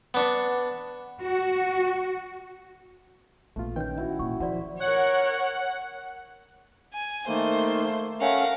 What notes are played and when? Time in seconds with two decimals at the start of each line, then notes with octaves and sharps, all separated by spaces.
0.14 B3 D4 C#6
1.20 F#4
3.56 A#1 A3 B3 F4
3.76 D#3 C#4 B4 G5 G6
3.97 E4 F#4
4.19 A#2 C#6
4.40 F3 C5 D5 F#5 B5
4.80 A#4 C#5 F#5
6.94 G#5
7.28 D#3 A3 A#3 C5
8.21 A3 C#4 A#4 F5 F#5